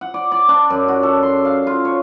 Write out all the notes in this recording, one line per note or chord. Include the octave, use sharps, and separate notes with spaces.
F#5
D5
D5
D4
F#2
F#4
A4
C6
F5
F4
C#5